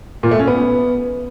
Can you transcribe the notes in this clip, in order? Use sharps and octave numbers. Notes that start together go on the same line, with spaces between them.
A#2
A3
C#4
B3